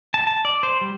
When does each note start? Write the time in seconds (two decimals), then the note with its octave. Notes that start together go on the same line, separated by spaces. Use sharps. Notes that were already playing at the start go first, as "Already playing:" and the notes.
0.14 A5
0.27 A5
0.45 D5
0.63 C5
0.81 G3